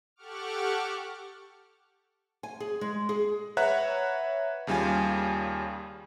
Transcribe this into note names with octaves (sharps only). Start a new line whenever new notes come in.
G4 A4 F#5 C#6 D6 F6
G#5
G#4
G#3
G#4
B4 C#5 E5 F#5 A#5 F#6
D#2 C#3 G3 F4 G#5